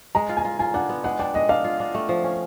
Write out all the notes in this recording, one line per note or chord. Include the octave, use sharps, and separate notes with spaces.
G#3 A#5
F4
G#5
F4
F4 G#5
D4 F#5
B3
G#3 F#5
D4 G5
G#3 D#5
D4 F5
F4
D4
A3
F3
C#4